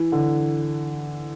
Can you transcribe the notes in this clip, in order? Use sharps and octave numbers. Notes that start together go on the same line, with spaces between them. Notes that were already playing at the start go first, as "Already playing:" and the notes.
Already playing: E3
D3